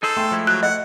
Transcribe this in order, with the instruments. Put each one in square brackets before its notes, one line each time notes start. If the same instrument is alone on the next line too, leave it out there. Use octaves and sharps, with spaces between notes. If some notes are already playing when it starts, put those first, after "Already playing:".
[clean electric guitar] D#4 G#4 C5 [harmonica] A4
[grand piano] A3 G5 C6
[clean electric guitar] F3 G#3 E4
[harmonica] F#3 [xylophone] F#6
[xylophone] D#5 [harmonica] F#5